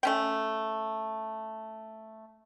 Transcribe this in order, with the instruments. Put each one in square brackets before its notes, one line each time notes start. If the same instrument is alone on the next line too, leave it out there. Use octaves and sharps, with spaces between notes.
[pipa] A3 C#4 G5